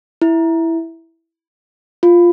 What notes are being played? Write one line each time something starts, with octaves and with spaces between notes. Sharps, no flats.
E4
F4